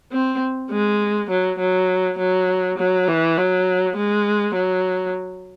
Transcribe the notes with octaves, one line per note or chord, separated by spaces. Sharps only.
C4
G#3
F#3
F#3
F#3
F#3
E3
F#3
G#3
F#3